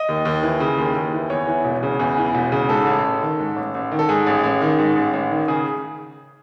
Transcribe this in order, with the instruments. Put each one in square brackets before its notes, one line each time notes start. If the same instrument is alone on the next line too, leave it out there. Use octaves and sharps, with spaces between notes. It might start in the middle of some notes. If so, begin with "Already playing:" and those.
Already playing: [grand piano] D#5
D#2
D#2
E3
C#3
D#2
D#2
E3
E2 C#5
E3
E1
C#3
E2
E3
E1
C#3
G#2 A4
A1
A1
D#3
G#2
A1
A1
D#3
A4
G#2 G#4
A1
A1
D#3
G#2
A1
A1
D#3
C#3 G#4